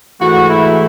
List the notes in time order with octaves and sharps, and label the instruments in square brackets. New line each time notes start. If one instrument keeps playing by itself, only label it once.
[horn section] G#2 E3 A3 F#4
E4